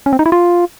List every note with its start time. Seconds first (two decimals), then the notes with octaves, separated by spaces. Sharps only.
0.06 C#4
0.13 C4
0.19 D#4
0.26 E4
0.32 F4